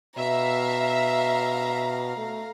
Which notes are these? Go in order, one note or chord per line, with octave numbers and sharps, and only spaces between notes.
B2 E5 F5 A#5
A3